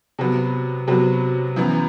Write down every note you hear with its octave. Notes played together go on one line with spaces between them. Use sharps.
C3 F#3 B3
C3 F#3 B3
F#2 E3 B3